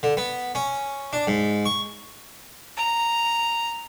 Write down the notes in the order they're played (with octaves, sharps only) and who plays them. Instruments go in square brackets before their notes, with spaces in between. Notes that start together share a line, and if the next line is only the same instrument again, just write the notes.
[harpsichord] D3
B3
C#4
D4
G#2
C#6
[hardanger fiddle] A#5